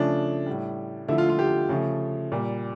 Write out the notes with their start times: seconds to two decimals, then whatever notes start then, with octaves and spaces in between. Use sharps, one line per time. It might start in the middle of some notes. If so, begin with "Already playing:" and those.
Already playing: C#3 F3 A3 D4
0.46 A2 G3
1.08 D3 F3 A3 E4
1.18 F4
1.29 F4
1.39 G4
1.69 C#3 F3 A3
2.32 A#2 G3